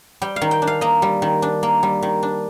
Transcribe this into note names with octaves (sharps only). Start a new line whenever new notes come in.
G3 G5
F5
D#3
G5
D4
F5
A#3 D#5
G3
D#3
D4
A#3
G3
D#3
D4